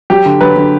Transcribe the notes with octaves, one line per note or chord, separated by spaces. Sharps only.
F#3 G4
D3
F#3 B4
D3